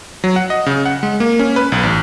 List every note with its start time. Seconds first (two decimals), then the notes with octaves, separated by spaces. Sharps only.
0.24 F#3
0.36 F#5
0.50 D#5
0.66 C#3
0.86 F#5
1.03 G#3
1.20 A#3
1.39 C#4
1.56 B4
1.72 B1
1.83 A1